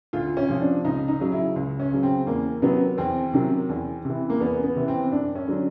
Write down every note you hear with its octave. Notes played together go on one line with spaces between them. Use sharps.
D2 F4
C#4
C3 F3
D4
C#2 D#4
D#4
C#3 F#3
E4
C#2
C#4
C#3 F#3
C4
E2 A#3
C3 D#3 F#3 B3
E2 C4
C3 D#3 F#3
E2
C3 E3
A#3
E2 B3
B3
C3 E3
C4
F#2 D4
C#4
D3 F#3